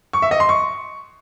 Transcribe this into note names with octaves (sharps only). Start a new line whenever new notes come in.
C#6
E5
D#5
C6
C#6